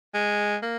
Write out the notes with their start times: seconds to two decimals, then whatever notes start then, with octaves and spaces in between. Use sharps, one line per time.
0.14 G#3
0.63 A#3